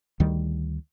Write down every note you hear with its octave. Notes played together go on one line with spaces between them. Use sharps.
D2 D#3 G3